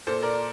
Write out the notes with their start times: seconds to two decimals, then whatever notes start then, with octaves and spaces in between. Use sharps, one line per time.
0.07 A#2 A4 C5
0.22 A#4 D5